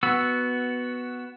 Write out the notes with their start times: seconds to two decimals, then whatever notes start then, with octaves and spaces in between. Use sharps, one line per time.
0.03 B3 F#4 E6